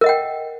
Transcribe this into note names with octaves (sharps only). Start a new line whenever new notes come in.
A#4 D#5 F#5 G5